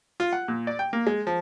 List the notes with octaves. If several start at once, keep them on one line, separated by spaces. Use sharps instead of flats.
F4
F#5
A#2
D5
G5
A#3
G#3
F3